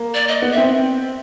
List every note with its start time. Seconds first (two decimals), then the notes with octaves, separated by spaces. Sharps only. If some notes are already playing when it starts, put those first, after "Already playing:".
Already playing: A#3
0.14 D5
0.27 D#5
0.42 B3
0.52 E5
0.57 C4